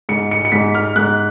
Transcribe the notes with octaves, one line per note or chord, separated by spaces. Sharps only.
G#2 C#7
C#7
C#7
G#2 B6
F6
G#2 F#6